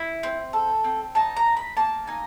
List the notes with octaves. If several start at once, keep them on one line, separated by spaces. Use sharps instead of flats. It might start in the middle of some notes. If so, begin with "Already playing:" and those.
Already playing: E4
C4
A4
C4
D#4 A5
A#5
D#4
B5
A#3 A5
D#4 G#5